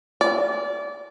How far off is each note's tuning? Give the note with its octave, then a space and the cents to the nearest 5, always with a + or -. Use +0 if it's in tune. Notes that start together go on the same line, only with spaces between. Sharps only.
D5 -25